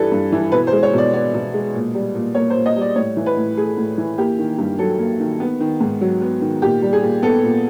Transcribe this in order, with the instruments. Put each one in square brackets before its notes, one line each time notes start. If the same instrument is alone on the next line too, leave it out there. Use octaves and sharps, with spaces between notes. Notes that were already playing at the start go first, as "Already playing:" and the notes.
Already playing: [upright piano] G2 E3 G3 A4 B4
G2
E3
B2 B4
C5
G#3
C#5
B2 D5
B3 D5
B2
G#3
A#2
G3
A#2
A#3 C#5
C5
A#2
D#5
G3
D5
A2 C#5
E3
B4
A2
A3 G#4
A2
E3
A#3 G4
D#3
G2
F#3 A4
A#3
D#3
B3
D#3
G#2
F#3
B3
D#3
A#2 G4
G3
G#4
A#2
B3 A4
A#2